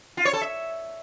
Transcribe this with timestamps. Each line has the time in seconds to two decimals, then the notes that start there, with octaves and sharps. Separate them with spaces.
0.17 F4
0.25 C#5
0.33 A4
0.41 E5